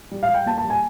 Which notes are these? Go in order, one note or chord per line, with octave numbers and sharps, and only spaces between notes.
G3
F5
G3
G5
A#3 A5
A5
G3
G#5